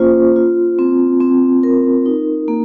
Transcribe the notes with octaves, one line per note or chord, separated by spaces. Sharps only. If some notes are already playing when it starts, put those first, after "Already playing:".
Already playing: A#3 C#4 F4 C5
F4
C4
C4
A#4
D#4
A#3